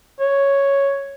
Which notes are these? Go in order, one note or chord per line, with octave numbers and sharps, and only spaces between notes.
C#5